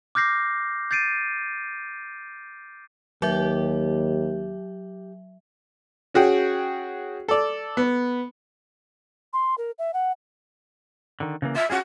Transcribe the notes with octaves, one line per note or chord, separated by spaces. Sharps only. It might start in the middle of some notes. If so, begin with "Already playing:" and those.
D6 F6 G6 A#6 C7
G6 A6 C7 D7 D#7
D#2 F#3 G4 E5
C#4 F#4 G#4 G5
A4 D5
B3
C6
A#4
E5
F#5
D3 D#3
C#3 E3 A#3
F4 E5 F5
C#4 F4 F#4 G#4